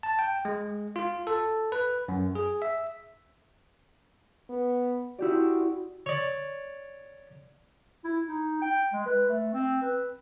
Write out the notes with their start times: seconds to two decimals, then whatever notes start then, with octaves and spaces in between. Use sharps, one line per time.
0.03 A5
0.19 G5
0.45 G#3
0.96 F4
1.27 A4
1.72 B4
2.08 F#2
2.35 G#4
2.62 E5
4.49 B3
5.19 E4 F#4 G4 D5
6.06 C#5 D5
8.05 E4
8.28 D#4
8.62 G5
8.93 G#3
9.06 B4
9.30 A3
9.54 C4
9.82 B4